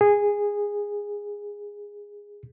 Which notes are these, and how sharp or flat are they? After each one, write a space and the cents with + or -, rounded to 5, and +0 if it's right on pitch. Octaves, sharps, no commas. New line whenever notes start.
G#4 -15